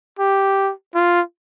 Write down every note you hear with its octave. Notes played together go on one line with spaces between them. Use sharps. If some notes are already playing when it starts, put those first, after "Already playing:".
G4
F4